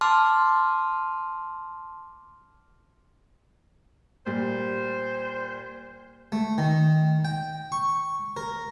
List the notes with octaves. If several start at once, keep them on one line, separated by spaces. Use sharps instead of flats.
A5 C6 D6 F6
A#2 G3 C5
A3
D#3
G5
C#6
A#4